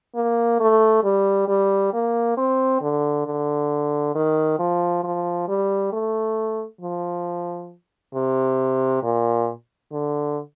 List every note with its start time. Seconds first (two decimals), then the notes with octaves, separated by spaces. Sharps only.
0.15 A#3
0.60 A3
1.04 G3
1.48 G3
1.93 A#3
2.37 C4
2.81 D3
3.26 D3
4.15 D#3
4.59 F3
5.04 F3
5.48 G3
5.92 A3
6.81 F3
8.15 C3
9.03 A#2
9.92 D3